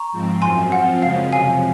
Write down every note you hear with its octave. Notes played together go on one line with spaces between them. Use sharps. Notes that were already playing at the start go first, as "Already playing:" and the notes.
Already playing: A#5 C#6
G#2 F3 C4
F#2 F3 C4 G#5 C6
F3 C4 F4 F#5
F#2 C#3 G#3 C#4 F5
F2 C3 F3 F5 G#5